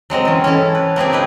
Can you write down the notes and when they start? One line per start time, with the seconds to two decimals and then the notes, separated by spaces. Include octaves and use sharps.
0.10 F#3 G#3 C4 D#5
0.25 E3 C#4
0.44 C#4 E4 A4
0.75 B4
0.96 A#3 C4 G4 G#4
1.13 D#4 E4 B4